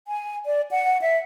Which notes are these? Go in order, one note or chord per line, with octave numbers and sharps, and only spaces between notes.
G#5
D5
F#5
E5